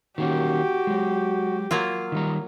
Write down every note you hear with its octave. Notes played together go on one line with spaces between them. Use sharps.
D#3 A#3 C#4 F#4 G4
F#3 G#3
F#3 A#3 F4
D#3 G3 A#5